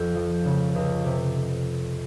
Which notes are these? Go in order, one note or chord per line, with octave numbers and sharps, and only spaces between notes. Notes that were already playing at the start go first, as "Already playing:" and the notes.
Already playing: F2
F3
C#3
C#2
C3